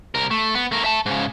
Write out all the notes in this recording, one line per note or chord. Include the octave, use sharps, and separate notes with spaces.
C2 A#4
A3
B3
A3 A#4
E5 A5
G#2 C#3